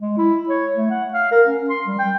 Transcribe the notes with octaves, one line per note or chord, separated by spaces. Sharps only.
G#3
E4
C#5
A3
F#5
F5
A#4
C#4
C6
G3
G5